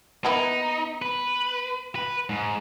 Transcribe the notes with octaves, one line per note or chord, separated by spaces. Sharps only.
A#3 B3 D#4 E4
B4
B4
G#2